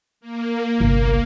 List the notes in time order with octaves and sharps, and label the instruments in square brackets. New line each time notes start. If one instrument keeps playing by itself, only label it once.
[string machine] A#3
[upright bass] G1 C2